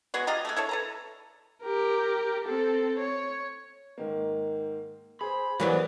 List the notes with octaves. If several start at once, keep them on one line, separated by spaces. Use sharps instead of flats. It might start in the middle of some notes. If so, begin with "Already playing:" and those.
F#3 G#3 B3 F#4
F4 G4 D#5 A#5
G#3 A3
E4 A4 C#5
A4 B4 A#5
G4 A#4
C4 A4
C#5
G#2 D#3 A#3
G#4 C5 B5
E3 F#3 G3 B3 A#4 B4 D5